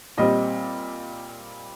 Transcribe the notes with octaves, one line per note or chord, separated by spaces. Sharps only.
A#2 G3 C4 D#5